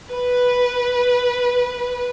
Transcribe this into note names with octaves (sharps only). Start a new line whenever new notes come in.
B4